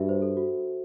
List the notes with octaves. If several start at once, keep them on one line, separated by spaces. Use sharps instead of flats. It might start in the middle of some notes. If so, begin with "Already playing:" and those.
Already playing: G2 F#4 E5
C5
A4
F#4